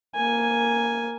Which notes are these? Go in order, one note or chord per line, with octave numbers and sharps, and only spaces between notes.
A#3 G#5